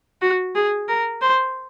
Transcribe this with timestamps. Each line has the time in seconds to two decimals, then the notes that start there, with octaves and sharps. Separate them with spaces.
0.22 F#4
0.56 G#4
0.88 A#4
1.22 C5